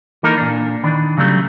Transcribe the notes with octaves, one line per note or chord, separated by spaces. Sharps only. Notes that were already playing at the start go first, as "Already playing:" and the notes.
E3 A#3 D#4 A4 A#4
A#2 D4
D#3 E3 D4
C#3 F#3 G3 A3